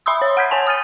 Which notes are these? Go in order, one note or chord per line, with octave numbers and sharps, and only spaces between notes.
E5 B5 C6 D#6 E6
C#5
F#5 F6 G6 G#6 B6
C#5 G#5 A5
D#6 F6 A6 D#7